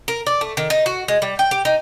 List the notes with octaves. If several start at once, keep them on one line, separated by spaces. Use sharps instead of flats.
A#4
D5
A3
D#3
D#4
F#4
G#3
G3
G5
G4
D#4